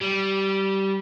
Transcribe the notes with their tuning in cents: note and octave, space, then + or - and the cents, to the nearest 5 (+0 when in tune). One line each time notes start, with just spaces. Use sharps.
G3 -15